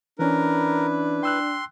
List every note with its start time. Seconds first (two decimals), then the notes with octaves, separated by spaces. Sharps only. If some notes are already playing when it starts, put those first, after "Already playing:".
0.19 E3 C#4 D4 E4 A#4 B4
1.23 G5 C6 E6 F#6